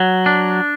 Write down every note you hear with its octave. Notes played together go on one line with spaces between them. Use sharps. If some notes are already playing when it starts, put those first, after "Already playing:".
Already playing: F#3
D4